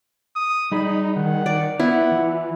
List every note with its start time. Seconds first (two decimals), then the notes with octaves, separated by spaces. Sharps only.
0.36 D#6
0.72 G3 D#4 G#4 D5 B5
1.17 D#3 F#5
1.46 D#3 D5
1.80 B3 E4 F4 F#5
2.12 E3